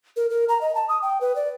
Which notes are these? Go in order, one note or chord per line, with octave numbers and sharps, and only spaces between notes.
A#4
A#4
A#5
D#5
A5
D#6
G5
B4
D5